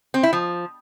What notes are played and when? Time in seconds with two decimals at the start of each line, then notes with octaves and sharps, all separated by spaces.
0.14 C4
0.23 E4
0.33 F3